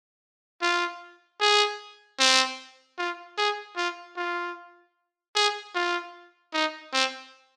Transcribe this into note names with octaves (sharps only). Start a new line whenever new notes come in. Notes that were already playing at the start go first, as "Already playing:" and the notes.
F4
G#4
C4
F4
G#4
F4
F4
G#4
F4
D#4
C4